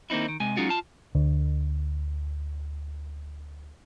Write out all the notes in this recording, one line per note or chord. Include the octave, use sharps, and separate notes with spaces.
D#3 A#3 C4 D#4 E4
D#3
C3 G#3 G#5
F#3 G#3 C#4 D#4 F4 F#4
F4 A5
D2 D3